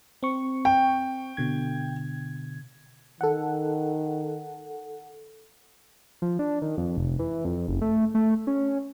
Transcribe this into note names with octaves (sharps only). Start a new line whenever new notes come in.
C4 C#6
G5
B2 D3 G#6
D#3 A4 F#5
F3
D4
D#3
F2
F1
E3
F2
F#1
A3
A3
C#4